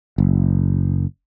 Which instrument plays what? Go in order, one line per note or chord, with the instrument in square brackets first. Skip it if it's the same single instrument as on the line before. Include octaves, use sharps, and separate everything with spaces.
[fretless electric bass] F#1